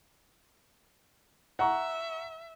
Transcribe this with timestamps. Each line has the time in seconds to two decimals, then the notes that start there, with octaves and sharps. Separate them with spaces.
1.59 E5 F#5 A#5 C#6